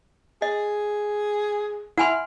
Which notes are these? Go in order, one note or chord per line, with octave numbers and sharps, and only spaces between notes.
G#4 D#5
E4 F#5 G#5 C6 F6